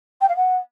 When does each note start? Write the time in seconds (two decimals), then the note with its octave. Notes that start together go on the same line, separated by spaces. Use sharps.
0.21 G5
0.28 F5
0.36 F#5